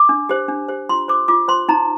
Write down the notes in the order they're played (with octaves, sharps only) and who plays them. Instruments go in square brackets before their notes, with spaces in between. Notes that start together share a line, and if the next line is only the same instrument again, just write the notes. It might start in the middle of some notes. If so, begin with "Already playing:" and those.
Already playing: [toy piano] D6
D4
G4 C5
D4
G4 C5
F4 C6
C5 D6
F4 D6
C5 C6
D#4 A#5